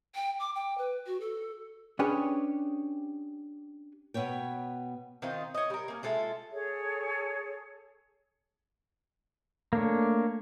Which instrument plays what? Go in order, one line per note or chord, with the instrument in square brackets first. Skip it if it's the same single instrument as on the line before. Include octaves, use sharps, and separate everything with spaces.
[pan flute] G5
D6
G5
B4
F#4
A4
[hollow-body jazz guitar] C#4 D4 G4 G#4 B4 C#5
[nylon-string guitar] B2 B3 C#5 G5
[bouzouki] D#3 C4 F4 D#5
C#5 D#5
G3 A#4
A#3 C#4
G#3 F4 A4 E5
[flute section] G#4 A4 C#5
[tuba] A3 [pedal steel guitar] A#3 D4 C#5